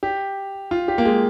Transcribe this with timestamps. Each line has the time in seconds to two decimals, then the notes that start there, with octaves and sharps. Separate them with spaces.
0.03 G4
0.71 F4
0.88 G4
0.98 A#3
1.05 G#3